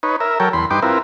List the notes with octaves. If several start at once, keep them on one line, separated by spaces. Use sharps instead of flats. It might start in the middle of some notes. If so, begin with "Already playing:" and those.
D#4 B4 C#5
A#4 E5
F#3 A4 A#4 C#5 G5
E2 B5 C6
G2 D#4 B4 G5 C6 D6
C4 E4 F4 A#4 B4